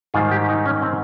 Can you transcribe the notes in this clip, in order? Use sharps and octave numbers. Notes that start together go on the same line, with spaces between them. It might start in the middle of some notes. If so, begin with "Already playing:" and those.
G#2 D#3 G3 F4
G4
D#4
C#4
C4